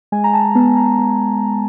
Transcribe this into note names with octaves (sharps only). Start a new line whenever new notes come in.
G#3 G#5
A#5
A5
B3 A5
A#5
B3